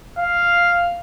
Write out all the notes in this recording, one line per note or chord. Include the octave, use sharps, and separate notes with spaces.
F5